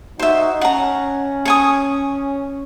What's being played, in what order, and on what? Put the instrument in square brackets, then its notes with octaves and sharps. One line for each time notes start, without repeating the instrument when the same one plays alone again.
[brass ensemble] D#4 F#4 [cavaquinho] C5 E5
[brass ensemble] C#4 [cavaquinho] F#5 A#5
[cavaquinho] C#5 G#5 D#6